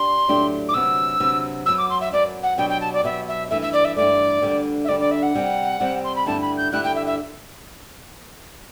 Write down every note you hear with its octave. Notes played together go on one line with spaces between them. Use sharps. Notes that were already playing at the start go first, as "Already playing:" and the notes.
Already playing: D4 G4 C6
A2 F#3 A3 D4 G4
D6
D2 C3 F#3 B3 E6
D2 C3 F#3 B3
F#2 F#3 B3 E6
D6
C6
E5
F#2 F#3 B3 D5
F#5
B2 F#3 B3 D4 G4 G5
G5
A5
D5
B2 F#3 B3 D4 G4 E5
E5
G2 E3 A3 E5
E5
D5
E5
G2 E3 A3 D5
D2 D3 G3 D4
E5
D2 D3 G3 D4 D5
D5
E5
F#5
C3 G3 C4
C3 G3 C4
C6
B5
G2 D3 A3 E4 G4 A5
B5
G6
G2 D3 A3 E4 G4 F#6
G5
E5
E5